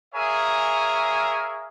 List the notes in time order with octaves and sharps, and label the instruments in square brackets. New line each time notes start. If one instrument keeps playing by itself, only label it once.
[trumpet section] G#4 A#4 C#5 E5 F5 G#5